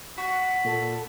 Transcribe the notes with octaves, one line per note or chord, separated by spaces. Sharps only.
F#4 F#5 B5
A#2 A4